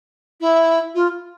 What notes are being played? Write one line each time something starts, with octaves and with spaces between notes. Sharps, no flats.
E4
F4